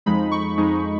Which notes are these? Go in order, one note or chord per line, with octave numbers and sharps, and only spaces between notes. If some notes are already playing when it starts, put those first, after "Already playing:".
F2 F3 G#3 D#4 B5
C#6
F2 F3 G#3 D#4